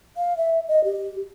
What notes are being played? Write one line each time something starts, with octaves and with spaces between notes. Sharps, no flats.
F5
E5
D#5
G4